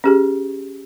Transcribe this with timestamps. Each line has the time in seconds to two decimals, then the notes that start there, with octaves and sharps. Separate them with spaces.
0.04 C#4 G4 G#4